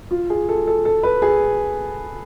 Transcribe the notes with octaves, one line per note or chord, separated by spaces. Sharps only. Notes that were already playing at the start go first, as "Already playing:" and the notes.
F4
G#4
A4
A4
A4
B4
G#4